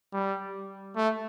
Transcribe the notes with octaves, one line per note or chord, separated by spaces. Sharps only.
G3
A3